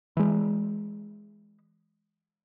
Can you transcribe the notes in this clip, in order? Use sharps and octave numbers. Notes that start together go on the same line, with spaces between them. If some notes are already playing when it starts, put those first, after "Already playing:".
E3 G#3